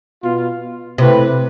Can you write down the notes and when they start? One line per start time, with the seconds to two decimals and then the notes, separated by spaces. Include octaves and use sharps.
0.22 B2 B3 F4
0.98 C3 A3 E4 B4